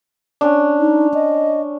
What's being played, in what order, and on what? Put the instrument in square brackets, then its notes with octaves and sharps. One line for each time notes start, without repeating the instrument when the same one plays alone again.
[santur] C#4 D4
[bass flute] D#4
D#5